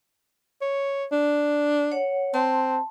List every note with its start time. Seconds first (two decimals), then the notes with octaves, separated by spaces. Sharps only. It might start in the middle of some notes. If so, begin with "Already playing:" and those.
0.61 C#5
1.12 D4
1.91 C#5 F#5
2.34 C4 A5 C6